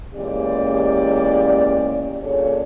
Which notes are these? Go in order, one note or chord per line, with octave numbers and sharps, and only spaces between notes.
E2 A#2 G#3 C#4 G4 D5
A#2 C#4 D4 G#4 A4 C#5